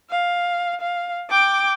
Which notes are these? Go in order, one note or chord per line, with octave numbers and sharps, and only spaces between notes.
F5
F5
G5 D6